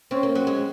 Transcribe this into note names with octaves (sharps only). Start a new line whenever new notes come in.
C4 C#4
A#3
F#3
G#3